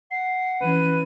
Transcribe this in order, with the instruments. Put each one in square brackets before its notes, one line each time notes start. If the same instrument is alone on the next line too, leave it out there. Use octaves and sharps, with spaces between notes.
[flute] F#5 [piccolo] C7
[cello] E3 C#4 [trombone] B4 [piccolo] D#7